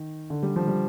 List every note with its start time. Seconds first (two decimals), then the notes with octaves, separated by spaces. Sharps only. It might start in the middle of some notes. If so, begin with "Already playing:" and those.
Already playing: D#3
0.30 D3
0.43 G3
0.56 F3
0.68 G3